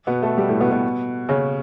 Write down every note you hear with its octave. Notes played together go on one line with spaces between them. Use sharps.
B2 B3
A3 A4
G3 G4
A2 A3
B2 B3
B2 B3
C#3 C#4